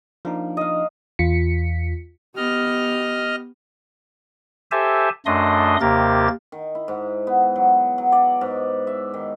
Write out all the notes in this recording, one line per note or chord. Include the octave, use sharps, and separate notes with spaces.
F3 A#3 D4 D#4
D#5 F5
E2 F4 B6 C#7
B3 G4 D#5 F6
G4 A4 C5 E5 G#5 A5
F#2 A3 D4 D#5 C6 D#6
D#2 C3 A#3 G4 A#4 A6
D#3
E4
G#2
B3
F#3
F#3
D5
G#2
E5
D#3